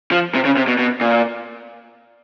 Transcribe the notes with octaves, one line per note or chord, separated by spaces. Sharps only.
F3
C3
C#3
C3
B2
B2
A#2